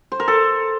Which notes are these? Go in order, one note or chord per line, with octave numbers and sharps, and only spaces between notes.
C5
A#4
A4